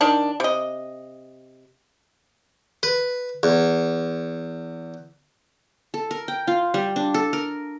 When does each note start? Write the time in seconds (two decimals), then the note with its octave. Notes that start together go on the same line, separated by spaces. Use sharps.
0.01 D#3 D4
0.40 C3 D#5
2.83 B4
3.43 E2
5.94 A4
6.11 A#4
6.28 G5
6.47 F4
6.74 G3
6.96 D4
7.14 A4
7.33 A#4